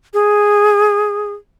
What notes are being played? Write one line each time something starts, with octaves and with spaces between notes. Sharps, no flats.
G#4